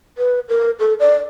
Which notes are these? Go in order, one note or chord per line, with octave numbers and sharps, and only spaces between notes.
B4
A#4
A4
D5